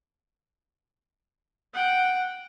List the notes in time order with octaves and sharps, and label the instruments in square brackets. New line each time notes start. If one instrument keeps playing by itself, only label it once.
[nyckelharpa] F#5 G5